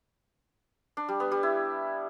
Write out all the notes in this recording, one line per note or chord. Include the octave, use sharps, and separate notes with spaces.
D4
G3
B3
G3
E4